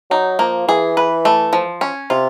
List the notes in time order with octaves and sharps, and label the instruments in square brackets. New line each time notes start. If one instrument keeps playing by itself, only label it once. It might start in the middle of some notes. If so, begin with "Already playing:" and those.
[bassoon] F#3 [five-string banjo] D#4
[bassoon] F3 [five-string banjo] A#3
[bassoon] E3 [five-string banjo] G#4
[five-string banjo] B4
A3
F3
C#4
[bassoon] C3 [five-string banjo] F4